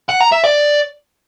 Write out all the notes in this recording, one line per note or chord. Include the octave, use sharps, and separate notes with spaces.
F#5
A#5
E5
D5